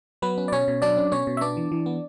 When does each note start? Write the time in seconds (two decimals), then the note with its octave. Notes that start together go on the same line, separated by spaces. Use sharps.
0.22 F#3 B3 B4
0.38 C#4
0.48 D5
0.52 B2 C#4 C#5
0.68 B2
0.82 F#3 D4 D5
0.97 C#4
1.12 B2 C#4 C#5
1.27 B2
1.37 E5
1.41 B3 D4 D5
1.57 E3
1.72 E3
1.86 B3